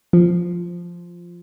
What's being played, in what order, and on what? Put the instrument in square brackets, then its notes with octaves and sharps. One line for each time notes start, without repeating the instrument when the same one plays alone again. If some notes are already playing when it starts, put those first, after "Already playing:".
[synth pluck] F3